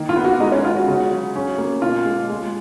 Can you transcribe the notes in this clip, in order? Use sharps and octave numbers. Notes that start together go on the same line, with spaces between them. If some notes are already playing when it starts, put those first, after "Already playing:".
Already playing: D#3 A#3
F4
B3
F#4
G#3 D#4
C#4
B3 F4
F#4
C#3
F#3
C#4
A#3
B2 F4
G#3
G#3